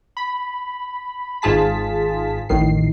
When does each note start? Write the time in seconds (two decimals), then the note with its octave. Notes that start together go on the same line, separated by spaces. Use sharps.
0.17 B5
1.42 G#1 G#2 F4 G#4 A5 B6
2.49 A1 F2 A2 D#3 C7